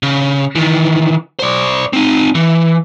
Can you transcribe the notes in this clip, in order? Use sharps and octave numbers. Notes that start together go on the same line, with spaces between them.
C#3
D#3 E3
C5 D5
C4 D#4
E3